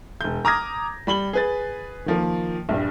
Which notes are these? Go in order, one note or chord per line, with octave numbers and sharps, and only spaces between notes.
E1 G6
A#5 D6 D#6 F6 G#6 A#6
G3 B5 F#7 G7
G#4 B4 A6
D#3 F3 A#3
A#1 G2 G3